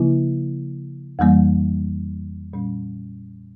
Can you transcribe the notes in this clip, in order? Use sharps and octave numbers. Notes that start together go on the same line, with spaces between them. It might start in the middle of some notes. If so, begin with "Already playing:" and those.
Already playing: C#3 F3 A#3 E4
F2 E3 G3 A#3
A#2 G3 C#4